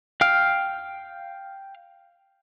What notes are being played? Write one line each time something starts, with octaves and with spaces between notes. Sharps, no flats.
F5 G5 F6